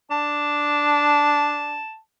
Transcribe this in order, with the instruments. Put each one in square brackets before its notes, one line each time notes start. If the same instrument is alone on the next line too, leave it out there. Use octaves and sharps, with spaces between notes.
[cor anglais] D4 [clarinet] A5